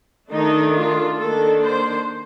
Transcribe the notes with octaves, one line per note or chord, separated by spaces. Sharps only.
D#3 A3 D4 D#4
F4
D#3 A#3 D4 A4
C5